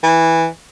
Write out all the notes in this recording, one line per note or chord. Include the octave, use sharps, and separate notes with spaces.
E3